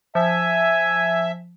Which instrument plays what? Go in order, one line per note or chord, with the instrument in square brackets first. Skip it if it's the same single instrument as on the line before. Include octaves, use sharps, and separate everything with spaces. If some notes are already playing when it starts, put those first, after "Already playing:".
[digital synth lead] F3 [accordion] E5 [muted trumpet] G#5